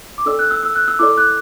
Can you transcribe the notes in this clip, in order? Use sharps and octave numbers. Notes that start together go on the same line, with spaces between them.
D6
D4 A4 D5 E6
F#6
E6
E6
F#6
E6
E4 A4 D5 D6
F#6